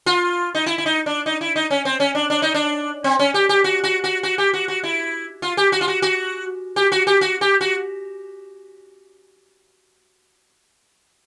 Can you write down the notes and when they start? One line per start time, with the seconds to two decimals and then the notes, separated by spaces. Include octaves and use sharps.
0.06 F4
0.55 D#4
0.66 E4
0.78 E4
0.86 D#4
1.06 D4
1.26 D#4
1.41 E4
1.56 D#4
1.71 C#4
1.85 C4
2.00 C#4
2.15 D4
2.30 D4
2.42 D#4
2.54 D4
3.04 C4
3.19 C#4
3.34 G4
3.49 G4
3.64 F#4
3.84 F#4
4.04 F#4
4.23 F#4
4.38 G4
4.53 F#4
4.68 F#4
4.83 E4
5.42 F4
5.57 G4
5.72 F#4
5.81 F4
5.88 F#4
6.02 F#4
6.76 G4
6.92 F#4
7.07 G4
7.21 F#4
7.41 G4
7.61 F#4